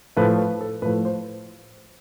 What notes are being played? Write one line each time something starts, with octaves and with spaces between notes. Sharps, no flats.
A2 F3 A3 B4
B4
A4
A2 F3 A3 B4
C5